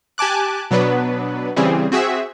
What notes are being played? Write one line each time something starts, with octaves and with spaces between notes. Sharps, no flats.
G4 G#5 A5 D6 F#6
B2 F#3 B3 D4 B4
C#3 E3 G3 C4 G#4
C4 F#4 G#4 E5